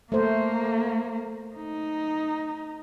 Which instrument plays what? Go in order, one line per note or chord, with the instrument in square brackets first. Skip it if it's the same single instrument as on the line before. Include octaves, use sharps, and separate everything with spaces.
[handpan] A3 C5 [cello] A#3
[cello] D#4